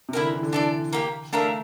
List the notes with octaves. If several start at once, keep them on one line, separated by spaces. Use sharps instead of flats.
C3
D3 E4 G4 A#4
E3
E3
D3
E3 D4 A4 D5
A#3 E4 G4
A3 D4 F4 A#4 E5